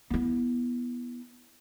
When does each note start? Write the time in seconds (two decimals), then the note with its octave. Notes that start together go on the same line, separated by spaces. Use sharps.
0.10 B3 E4